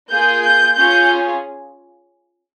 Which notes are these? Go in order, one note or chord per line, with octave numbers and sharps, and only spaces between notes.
A#3 F4 G#4 G6
G6
C#4 F4 G#4 G6